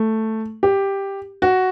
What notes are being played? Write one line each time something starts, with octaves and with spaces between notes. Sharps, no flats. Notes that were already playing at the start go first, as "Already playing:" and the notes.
Already playing: A3
G4
F#4